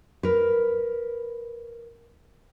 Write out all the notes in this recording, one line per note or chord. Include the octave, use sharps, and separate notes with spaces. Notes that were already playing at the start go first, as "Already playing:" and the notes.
A#4 B4